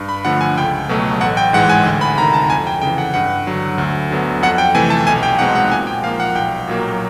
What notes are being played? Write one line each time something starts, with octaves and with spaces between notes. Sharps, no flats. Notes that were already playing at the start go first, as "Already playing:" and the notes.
Already playing: G2
B5
D3 F3 A3 F#5
G#5
C#2 G5
B2 F#3 A3
A1 F#5
G5
G#2 E3 G#3 F#5
G#5
D2
B5
C3 D#3 A#5
A5
F2 G#5
G5
C#3 E3 G5
F#5
G2 F#5
D3 F#3
D2
D3 F#3 B3
F2 F#5
G5
C3 E3 A3 G#5
A5
B1 G#5
G5
B2 G#3 C4 D#4 F#5
F#5
A#2 G#5
G5
F3 A#3 F5
F#5
B1 G5
A#2 F#3 A#3